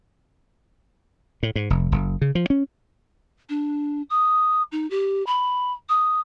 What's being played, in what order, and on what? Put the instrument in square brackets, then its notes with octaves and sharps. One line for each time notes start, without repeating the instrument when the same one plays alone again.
[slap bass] A2
G#2
F1
F#1
C#3
F3
C#4
[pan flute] D4
D#6
D#4
G4
B5
D#6